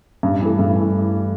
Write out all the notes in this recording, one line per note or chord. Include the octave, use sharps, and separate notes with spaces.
G2
E3 A3
G2
E3